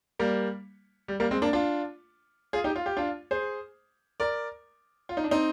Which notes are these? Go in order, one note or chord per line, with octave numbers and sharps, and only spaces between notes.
G3 A#3
G3
G3 A#3
G#3 C4
A#3 D4
D4 F4
F4 G#4
D#4 G4
F4
G4
D4 F4
G#4 C5
A#4 D5
F4
D#4
D4
C4 D#4